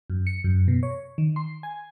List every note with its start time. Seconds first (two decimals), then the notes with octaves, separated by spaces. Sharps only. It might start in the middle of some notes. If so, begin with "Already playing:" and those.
0.10 F#2
0.27 C#7
0.44 F#2
0.68 B2
0.83 C#5
1.18 D#3
1.36 C6
1.63 G#5